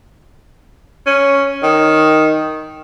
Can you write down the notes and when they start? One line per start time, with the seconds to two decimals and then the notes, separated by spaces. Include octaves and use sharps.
1.06 C#4
1.63 D#3